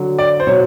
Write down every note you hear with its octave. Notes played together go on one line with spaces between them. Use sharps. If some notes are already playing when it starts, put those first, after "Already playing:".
Already playing: D3 F#3
D5
C5
B2 F#3 C#5